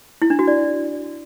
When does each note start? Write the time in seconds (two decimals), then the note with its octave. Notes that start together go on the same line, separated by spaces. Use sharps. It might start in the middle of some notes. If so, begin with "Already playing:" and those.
0.22 E4
0.30 D4
0.39 F#4
0.48 D5